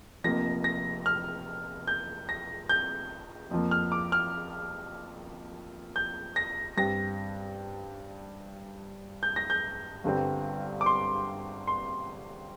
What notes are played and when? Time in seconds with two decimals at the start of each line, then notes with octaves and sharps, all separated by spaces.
0.24 F1 F2 F3 A#3 A#6
0.64 A#6
1.06 F6
1.87 G6
2.29 A#6
2.69 G6
3.51 F2 F3 A#3
3.71 F6
3.92 D6
4.12 F6
5.96 G6
6.36 A#6
6.77 G2 G3 C4 A#6
9.23 G6
9.36 A#6
9.50 G6
10.04 G1 G2 D3 G3 C4
10.81 D6
10.86 C6
11.67 C6